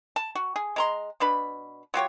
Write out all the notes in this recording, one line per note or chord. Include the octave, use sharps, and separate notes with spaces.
A5
F#4
G#4
G#3 A#5 C6
B2 D4 B4 B5
F#3 F4 G4 C#5